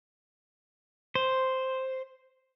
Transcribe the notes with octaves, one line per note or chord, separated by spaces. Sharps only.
C5